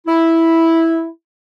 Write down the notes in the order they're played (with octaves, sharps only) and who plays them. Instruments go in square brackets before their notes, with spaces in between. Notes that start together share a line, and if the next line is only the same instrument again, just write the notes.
[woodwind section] E4